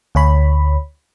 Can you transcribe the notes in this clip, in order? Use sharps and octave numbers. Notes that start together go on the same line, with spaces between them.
D2 C#5 B5